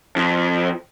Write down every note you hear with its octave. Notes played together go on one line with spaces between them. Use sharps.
F2